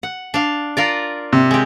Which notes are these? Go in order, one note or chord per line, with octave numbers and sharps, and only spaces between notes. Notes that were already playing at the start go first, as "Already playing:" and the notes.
F#5
D4 F5
F4 A#4 D5
C3
G#3 G4